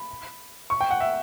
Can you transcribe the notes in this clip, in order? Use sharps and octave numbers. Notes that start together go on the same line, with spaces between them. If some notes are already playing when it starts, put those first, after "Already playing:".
Already playing: B5
C#6
G5
F#5
E5